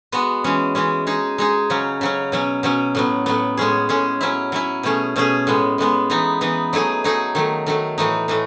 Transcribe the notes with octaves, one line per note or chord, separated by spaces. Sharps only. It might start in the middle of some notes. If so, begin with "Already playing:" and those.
G#3 B3 F#4
E3 G#3 C#4
E3 G#3 C#4
G#3 D#4 G#4
G#3 D#4 G#4
C#3 F#3 C#4
C#3 F#3 C#4
B2 F#3 C#4
B2 F#3 C#4
A2 F#3 B3
A2 F#3 B3
A2 G#3 C#4 G#4
A2 G#3 C#4 G#4
F#3 C#4 E4
F#3 C#4 E4
B2 A3 C#4 G#4
B2 A3 C#4 G#4
A2 G#3 B3
A2 G#3 B3
E3 B3 D#4
E3 B3 D#4
F#3 A3 D#4 G#4
F#3 A3 D#4 G#4
D#3 F#3 A3
D#3 F#3 A3
A2 E3 A3 D#4
A2 E3 A3